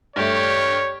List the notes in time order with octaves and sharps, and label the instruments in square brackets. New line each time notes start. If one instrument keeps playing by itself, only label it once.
[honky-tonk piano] G2 A3 [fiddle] G4 [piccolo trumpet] C#5